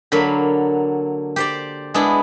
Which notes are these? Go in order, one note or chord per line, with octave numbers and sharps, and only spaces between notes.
D3 F#3 A#3 B5
G4 C5 D5
G#3 B3 D4 E4